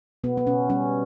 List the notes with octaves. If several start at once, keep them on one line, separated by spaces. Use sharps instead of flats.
B2 B3
B3
B2 C#4
G3 C#4